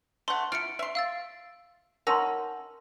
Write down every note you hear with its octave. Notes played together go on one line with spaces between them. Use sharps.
A3 F#5 C6
E4 F4 F6 C#7 D7
E5 C6
F5 E6 A6
C#4 D#4 A#4 F#5 A5 C6 E6 A#6